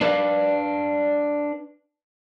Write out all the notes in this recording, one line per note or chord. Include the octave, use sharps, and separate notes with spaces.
D4 B4 D5 E5 F5